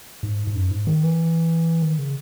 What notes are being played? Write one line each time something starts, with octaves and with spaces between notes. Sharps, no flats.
G#2
G#2
F#2
G#2
D#3
E3
D#3
C#3